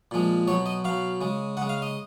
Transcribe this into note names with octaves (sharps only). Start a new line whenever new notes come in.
A#2 F3 G#3
B2 F#3 C#5
D#5
B2 F#3 F5
C#3 G#3
C#3 G#3 F#5
F5
D#5